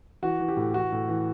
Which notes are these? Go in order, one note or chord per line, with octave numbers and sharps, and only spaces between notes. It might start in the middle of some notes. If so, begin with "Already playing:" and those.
E3 F#4
E3
G4
A2
E3 F#4
A2
E3